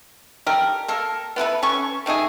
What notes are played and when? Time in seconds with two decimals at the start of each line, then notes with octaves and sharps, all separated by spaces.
0.46 G4 A4 A#4
0.88 A#3 A4 A#4
1.36 B3 E4 A4 B4
1.63 C#4 A4 C#6
2.06 D#3 A3 D#4 G#4